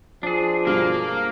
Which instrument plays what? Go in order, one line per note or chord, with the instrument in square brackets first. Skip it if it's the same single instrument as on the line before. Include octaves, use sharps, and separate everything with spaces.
[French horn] F3 [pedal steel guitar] D4 G#4
[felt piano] G2 B2 G3 [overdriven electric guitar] A#3